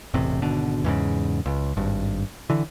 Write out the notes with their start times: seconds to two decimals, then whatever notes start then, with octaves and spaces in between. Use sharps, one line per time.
0.14 E1 A1 C3
0.42 G#1 B2 D3
0.84 E2 G#2 C#3
1.46 C#2
1.77 G#1 G2
2.50 D3 E3